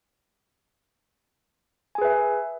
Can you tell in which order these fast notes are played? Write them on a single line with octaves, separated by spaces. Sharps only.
G#5 G#4 B4 E5